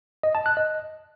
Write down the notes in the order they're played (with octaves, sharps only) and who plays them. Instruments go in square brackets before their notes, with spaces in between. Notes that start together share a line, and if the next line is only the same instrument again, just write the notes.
[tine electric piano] D#5
A5
F#6
D#5